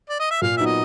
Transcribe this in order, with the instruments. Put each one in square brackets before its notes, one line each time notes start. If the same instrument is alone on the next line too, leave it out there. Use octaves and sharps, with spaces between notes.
[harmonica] D5
D#5
E5
[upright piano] A#2 [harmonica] F5
[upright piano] F#3 B3 D#4 [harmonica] E5
[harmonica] D#5